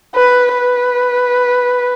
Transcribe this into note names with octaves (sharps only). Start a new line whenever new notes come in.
B4
B4